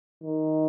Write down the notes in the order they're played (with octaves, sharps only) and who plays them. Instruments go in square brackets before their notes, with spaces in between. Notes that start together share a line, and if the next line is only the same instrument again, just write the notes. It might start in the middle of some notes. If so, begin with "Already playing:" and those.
[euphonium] D#3